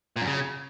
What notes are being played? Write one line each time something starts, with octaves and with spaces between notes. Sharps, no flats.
A#2
F#2
C#3